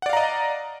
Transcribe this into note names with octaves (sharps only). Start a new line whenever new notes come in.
D5 D#5 F5 F#5 A#5